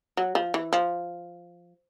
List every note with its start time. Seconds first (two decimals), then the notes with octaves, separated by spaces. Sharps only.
0.17 F#3
0.35 F3
0.54 E3
0.73 F3